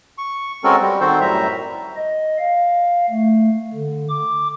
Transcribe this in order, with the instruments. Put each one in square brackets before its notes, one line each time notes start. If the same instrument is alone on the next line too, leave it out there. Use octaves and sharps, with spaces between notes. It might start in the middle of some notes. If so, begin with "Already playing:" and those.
[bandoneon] C#6
G#3 C4 C#4 F#4 A4 A#4
G3
D#3 C4 F#4 A4 C5
F#2 A2 G3 E5 A#5
[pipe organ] D#5
F5
A3
D3
D6